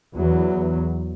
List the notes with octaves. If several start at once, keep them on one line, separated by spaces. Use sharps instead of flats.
E2 F#3